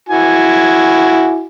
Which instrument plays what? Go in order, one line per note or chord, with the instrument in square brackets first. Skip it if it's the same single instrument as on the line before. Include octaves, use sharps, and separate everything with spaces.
[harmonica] E4 F#4 G#5